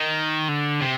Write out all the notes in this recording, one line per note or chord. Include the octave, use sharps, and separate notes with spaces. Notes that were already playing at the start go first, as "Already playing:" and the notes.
Already playing: D#3
D3
C3